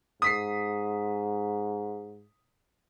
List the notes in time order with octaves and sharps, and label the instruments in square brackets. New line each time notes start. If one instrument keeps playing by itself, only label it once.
[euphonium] G#2 [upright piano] D#6 B6 C7